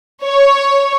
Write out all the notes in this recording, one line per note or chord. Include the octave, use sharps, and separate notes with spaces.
C#5